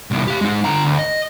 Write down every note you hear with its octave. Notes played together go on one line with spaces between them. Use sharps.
C2 A#2
G4 F5
G#3 D#4
D3 A#5
D2
D#5